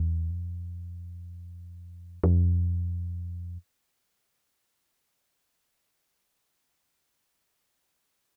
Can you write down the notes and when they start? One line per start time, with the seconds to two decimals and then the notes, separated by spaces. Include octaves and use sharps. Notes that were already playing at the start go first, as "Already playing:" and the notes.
Already playing: E2
0.31 F2
2.24 F2